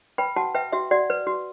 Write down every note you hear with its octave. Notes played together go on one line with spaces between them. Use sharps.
B4 G5 B5
F#4 F#5 A5
B4 E5 G5
F#4 E5
F#4 D5 F#5
B4
F#4